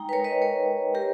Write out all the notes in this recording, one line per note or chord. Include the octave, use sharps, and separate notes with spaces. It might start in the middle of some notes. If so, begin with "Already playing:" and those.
Already playing: G#3 D#4 G5 A#5
B4
A#4 C#5
B4 D#5
A#4 C#5
G4 A#4